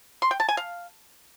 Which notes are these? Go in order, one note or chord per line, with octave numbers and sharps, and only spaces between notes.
C6
G5
A5
G#5
F5